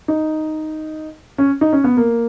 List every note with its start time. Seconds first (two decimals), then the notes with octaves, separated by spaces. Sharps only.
0.08 D#4
1.38 C#4
1.61 D#4
1.73 C#4
1.84 B3
1.97 A#3